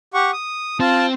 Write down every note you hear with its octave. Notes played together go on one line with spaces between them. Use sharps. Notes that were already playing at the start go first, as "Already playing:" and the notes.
G4 F#5 C#6
D#6
C4 F4 A5